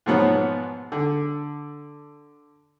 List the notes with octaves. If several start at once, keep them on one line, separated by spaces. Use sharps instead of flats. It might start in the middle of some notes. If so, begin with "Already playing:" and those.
G#2 B2 F3 F#3 B3
D3